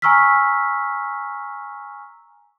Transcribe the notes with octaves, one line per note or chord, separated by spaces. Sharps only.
G#5 A#5 C#6 E6 F6 B6